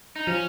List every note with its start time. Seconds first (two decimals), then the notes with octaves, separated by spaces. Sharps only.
0.16 D#4
0.27 F3 C#4